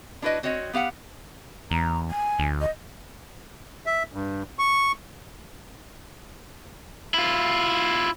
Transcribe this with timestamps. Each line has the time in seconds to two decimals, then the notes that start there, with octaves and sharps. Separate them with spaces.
0.22 D4 E4 F#4 B4 D#5
0.43 C4 F#4 C#5 D#5
0.73 B3 G4 F5 F#5
1.71 E2 A#5
2.11 G#5
2.39 D2
2.61 D#5
3.86 E5
4.13 G2
4.59 C#6
7.14 E4 F4